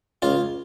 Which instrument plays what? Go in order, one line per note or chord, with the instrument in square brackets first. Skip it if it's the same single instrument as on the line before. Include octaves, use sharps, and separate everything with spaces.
[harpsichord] C#2 F4